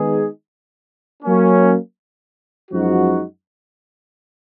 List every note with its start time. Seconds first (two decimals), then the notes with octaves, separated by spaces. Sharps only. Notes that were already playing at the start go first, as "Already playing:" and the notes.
Already playing: D#3 G#3 B3 D#4 G#4
1.23 F#3 A#3 C#4
2.71 F#2 F3 G#3 D#4 F#4